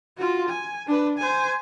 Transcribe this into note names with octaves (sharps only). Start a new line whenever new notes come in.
F4 F#4
G#5
D4 B4
C5 G#5